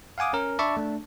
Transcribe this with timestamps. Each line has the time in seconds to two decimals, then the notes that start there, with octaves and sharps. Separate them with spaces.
0.18 F5 F#5 G#5 D6 D#6
0.33 C#4 A#4
0.59 D4 D5 E5 A5 B5 C#6
0.77 A3 D4